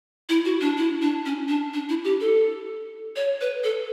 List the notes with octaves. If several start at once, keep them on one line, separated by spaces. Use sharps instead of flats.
E4
F#4
D4
E4
D4
C#4
D4
D4
E4
G4
A4
C#5
B4
A4